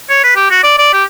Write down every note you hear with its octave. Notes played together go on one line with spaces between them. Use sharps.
C#5
B4
G4
F#4
D5
D5
G4